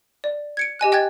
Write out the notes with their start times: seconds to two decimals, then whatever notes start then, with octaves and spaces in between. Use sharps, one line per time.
0.24 D5
0.57 G#6 C#7 D7
0.79 G4 D#5 G#5 F#6
0.92 D#5 G5 F#6 G#6 A6